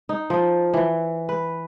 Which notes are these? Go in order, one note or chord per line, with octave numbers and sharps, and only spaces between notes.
D#4
F3
E3
B4